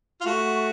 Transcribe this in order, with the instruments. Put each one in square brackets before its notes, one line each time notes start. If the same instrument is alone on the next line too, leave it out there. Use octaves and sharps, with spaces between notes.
[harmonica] F4
[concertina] A3 [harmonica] F#4